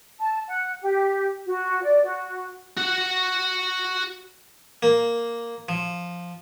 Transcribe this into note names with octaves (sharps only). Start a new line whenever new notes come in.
A5
F#5
G4
F#4
D5
F#4
F#4 F#5
A#3
F3